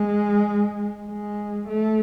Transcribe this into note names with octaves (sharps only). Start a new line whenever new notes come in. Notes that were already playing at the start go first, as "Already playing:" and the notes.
Already playing: G#3
G#3
A3